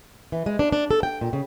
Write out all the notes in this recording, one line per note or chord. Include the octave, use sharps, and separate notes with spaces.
E3
G#3
D4
D4
A4
G5
A#2
C#3